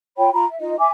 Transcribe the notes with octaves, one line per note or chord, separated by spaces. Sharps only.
F4 C#5 G5 B5
F4 A#5 B5
E5
D#4 F4 D#5
E5 G#5 D6